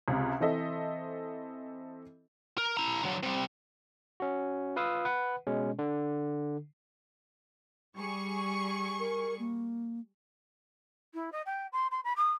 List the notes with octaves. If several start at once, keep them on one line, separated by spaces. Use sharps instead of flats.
C#2 C3
E3 C4 A4 D#5 E5
A#4
E4 A#5
D3 F#3
C3 G3
C#4 F#4
F4 B4 F5 D#6 E6
B4 F#5
B2 G#3 C#4
D3
G3 G#4 C#6
A#4
A#3
E4
D#5
G5
C6
C6
B5
D#6